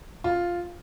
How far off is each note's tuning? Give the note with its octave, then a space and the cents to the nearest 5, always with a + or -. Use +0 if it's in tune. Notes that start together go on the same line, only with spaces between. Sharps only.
F4 +0